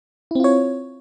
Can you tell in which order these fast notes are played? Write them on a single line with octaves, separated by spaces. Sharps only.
E4 C4 F4 C#5